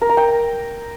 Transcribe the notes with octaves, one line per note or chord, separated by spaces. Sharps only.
A#4
A#5
G5